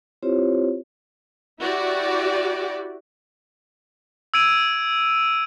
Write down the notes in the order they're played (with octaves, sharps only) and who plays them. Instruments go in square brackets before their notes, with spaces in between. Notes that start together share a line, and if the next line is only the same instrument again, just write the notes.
[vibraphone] C4 E4 F4 G4 C5 C#5
[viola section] E4 F#4 G4 D5
[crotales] E6 G#6 D7 D#7 F7